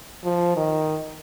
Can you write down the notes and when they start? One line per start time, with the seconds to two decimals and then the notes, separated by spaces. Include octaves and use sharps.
0.24 F3
0.56 D#3